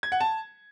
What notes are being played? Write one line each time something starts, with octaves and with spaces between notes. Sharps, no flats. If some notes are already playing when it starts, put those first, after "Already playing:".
G#6
F#5
A5